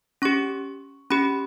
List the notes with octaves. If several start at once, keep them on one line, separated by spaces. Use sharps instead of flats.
C#4 G4 C#6
C#4 G4 B5